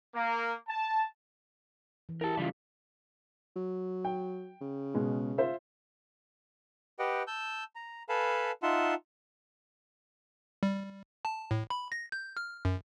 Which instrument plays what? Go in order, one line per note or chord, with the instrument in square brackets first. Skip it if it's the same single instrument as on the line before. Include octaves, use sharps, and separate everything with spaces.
[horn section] A#3
A5
[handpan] E3
[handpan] E4 G4 [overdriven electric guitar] A#4 A5
[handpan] C#3 E3 [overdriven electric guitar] G3 F4
[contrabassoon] F#3
[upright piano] G5
[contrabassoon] C#3
[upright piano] B2 G#3
F4 C5 E5
[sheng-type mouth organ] G4 B4 D#5 F#5 G5
A5 E6 G6
A#5
A4 B4 F5 G#5 A5 B5
D#4 F4 E5 F#5 A5 C6
[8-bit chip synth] G3
A5
A2
B5
A#6
G6
F6
F#2